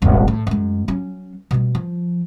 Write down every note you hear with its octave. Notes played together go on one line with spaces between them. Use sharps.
D#1 G#1
A2
F#2 G#3
F#3 C#4
B2 G3
F3